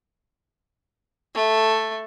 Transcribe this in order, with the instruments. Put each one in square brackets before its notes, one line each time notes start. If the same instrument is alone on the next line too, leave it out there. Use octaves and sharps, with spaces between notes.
[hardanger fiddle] A3